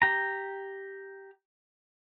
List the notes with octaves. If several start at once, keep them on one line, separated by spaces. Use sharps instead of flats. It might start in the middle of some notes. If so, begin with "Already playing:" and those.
G4 A#5